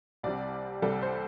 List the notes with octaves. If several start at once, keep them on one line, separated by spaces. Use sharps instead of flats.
C2 C3 G3 D5
C2 C3 G3 A4
C5